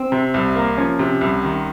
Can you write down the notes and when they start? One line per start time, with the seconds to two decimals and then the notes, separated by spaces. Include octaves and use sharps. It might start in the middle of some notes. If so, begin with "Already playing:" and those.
Already playing: C4
0.12 C3
0.34 C2
0.55 A#3
0.78 F3 C#4
0.99 C3
1.21 C2
1.43 D#3